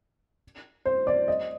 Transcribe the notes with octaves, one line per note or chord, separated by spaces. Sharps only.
C5
D5
D#5